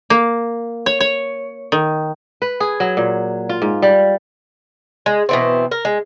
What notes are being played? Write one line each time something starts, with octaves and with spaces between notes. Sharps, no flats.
A#3
C#5
C#5
D#3
B4
G#4
F#3
A#2
F4
G#2
G3
G#3
B2 E3 C4
A#4
G#3